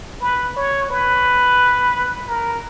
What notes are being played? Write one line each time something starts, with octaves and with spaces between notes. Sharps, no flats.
B4
C#5
B4
A#4